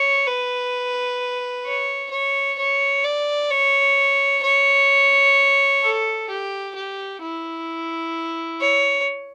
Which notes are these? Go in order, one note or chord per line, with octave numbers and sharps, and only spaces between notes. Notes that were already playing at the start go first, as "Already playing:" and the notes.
Already playing: C#5
B4
C#5
C#5
C#5
D5
C#5
C#5
A4
G4
G4
E4
C#5